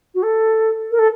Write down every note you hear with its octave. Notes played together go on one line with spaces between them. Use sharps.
F#4
A4
A#4
A4